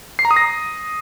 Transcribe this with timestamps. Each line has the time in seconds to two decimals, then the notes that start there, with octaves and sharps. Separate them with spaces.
0.19 C7
0.25 A#5
0.31 D#6
0.36 A#6